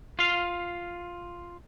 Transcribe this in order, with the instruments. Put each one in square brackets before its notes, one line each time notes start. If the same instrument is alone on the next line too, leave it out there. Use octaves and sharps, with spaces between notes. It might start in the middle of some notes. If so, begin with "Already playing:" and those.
[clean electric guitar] F4 F5